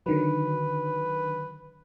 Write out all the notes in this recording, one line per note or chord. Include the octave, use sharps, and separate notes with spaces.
D3 D#3 F#3 B4